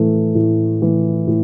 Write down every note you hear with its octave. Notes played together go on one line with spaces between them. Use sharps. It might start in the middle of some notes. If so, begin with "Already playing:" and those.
Already playing: A2 E3 A3
A2
E3 A3
A2